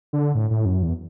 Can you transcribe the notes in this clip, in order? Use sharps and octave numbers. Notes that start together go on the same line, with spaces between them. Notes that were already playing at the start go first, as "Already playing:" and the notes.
D3
A2
A2
F#2
E2